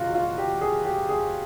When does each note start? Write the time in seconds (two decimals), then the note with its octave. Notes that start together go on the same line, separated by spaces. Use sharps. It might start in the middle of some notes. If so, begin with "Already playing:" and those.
Already playing: F#1 E2 B2 F4 F#4
0.14 F4
0.38 G4
0.61 G#4
0.85 G4
1.09 G#4